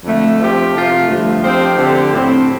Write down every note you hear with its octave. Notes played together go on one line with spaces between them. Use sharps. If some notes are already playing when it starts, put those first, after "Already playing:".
F2 D3 A3
F3 C4 G4
C3 F3 A3 F4
G2 D3 F3 A3
F2 F3 C4 G4 C5
D3 A3 C4 G4
A2 F3 C4